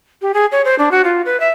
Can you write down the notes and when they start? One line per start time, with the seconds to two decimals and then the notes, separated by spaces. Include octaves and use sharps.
0.22 G4
0.34 G#4
0.52 C#5
0.65 C5
0.79 D4
0.91 F#4
1.04 F4
1.25 B4
1.40 E5